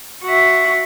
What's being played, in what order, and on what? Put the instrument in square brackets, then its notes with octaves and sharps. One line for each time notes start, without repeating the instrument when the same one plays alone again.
[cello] F#4 E5